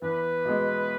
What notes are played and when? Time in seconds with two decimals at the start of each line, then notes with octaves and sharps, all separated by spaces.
0.02 E2 B4
0.45 B2 G#3